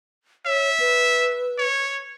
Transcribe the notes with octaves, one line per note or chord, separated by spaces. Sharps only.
C#5 E5
B4
C#5